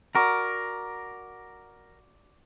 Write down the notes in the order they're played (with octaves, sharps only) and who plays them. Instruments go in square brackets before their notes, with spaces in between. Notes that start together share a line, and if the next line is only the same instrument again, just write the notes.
[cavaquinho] F#4 D5 [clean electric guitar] A#4